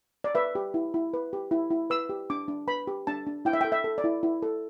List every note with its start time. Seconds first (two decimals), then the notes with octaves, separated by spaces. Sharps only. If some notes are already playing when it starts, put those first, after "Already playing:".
0.24 D5
0.35 B4 E5
0.55 G4
0.74 E4
0.94 E4
1.14 B4
1.33 G4
1.51 E4
1.71 E4
1.90 B4 E6
2.09 G4
2.30 D4 D6
2.48 D4
2.68 B4 B5
2.87 G4
3.07 D4 A5
3.27 D4
3.45 E4 G5
3.53 E5
3.61 G5
3.64 A4
3.72 E5
3.84 A4
3.98 D5
4.04 E4
4.23 E4
4.42 A4